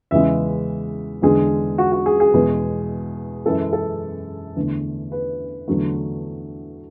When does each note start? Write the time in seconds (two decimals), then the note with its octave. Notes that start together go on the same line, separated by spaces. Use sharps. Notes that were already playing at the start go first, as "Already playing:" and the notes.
0.11 E2 C#3 E3 G#3 E5
1.22 E2 D3 G#3 G#4
1.78 F#4
1.92 F#4
2.06 G#4
2.20 G#4
2.34 E2 B2 G#3
3.46 F#2 E3 G#3 A4
3.73 A4
4.56 E2 D3 A3
5.12 B4
5.68 E2 D3 F#3 A3